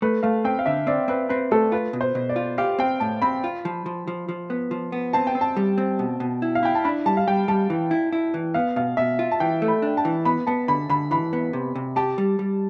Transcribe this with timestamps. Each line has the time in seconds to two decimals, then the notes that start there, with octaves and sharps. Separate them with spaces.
0.02 A3 B4
0.23 A3 F5
0.45 C4 G5
0.59 F5
0.66 D3 E5
0.87 C4 D5
1.08 C4 B4
1.29 C4 B4
1.51 A3 A4
1.72 F4 B4
1.93 B2
2.01 C5
2.15 B2
2.29 D5
2.36 F4
2.58 G4 F5
2.79 C4 G5
3.00 A2 A5
3.22 C4 B5
3.44 F4
3.65 F3
3.86 F3
4.08 F3
4.29 F3
4.50 B3
4.71 F3
4.92 B3
5.13 C4 A5
5.27 G5
5.35 C4
5.41 A5
5.57 G3
5.78 C4
5.99 B2
6.20 B2
6.42 E4
6.55 F5
6.63 E4 G5
6.75 A5
6.84 D4 B5
7.06 G3 A5
7.17 F5
7.27 G3 G5
7.48 G3 A5
7.70 E3
7.91 E4
8.12 E4
8.34 E3
8.54 B3 F5
8.76 B2 F5
8.97 B2 E5
9.19 F4
9.31 A5
9.40 E3 G5
9.62 A3
9.68 B5
9.82 D4
9.97 A5
10.05 E3
10.25 B3 B5
10.47 B3 A5
10.68 D3 B5
10.89 D3 B5
11.11 E3 B5
11.33 B3
11.53 C3
11.75 C3
11.96 G4 A5
12.18 G3
12.39 G3